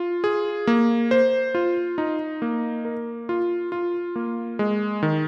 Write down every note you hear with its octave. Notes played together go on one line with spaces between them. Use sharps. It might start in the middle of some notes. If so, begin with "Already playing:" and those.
Already playing: F4
G#4
A#3
C5
F4
D#4
A#3
A#4
F4
F4
A#3
G#3
D#3